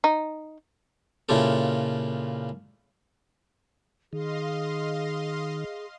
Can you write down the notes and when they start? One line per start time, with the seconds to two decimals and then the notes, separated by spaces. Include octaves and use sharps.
0.04 D#4
1.29 A#2 C#3 E4 F4 G4 A4
4.13 D#3 G#4 D#5 F5 C6